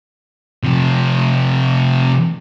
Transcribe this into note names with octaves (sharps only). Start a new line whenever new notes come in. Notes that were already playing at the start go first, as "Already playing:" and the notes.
C3 F3